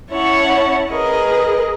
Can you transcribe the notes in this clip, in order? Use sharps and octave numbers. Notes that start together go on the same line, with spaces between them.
C#4 E4 C#5 F#5 A5
G#4 A#4 B4 D#5